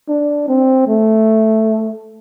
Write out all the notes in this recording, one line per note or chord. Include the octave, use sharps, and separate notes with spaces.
D4
C4
A3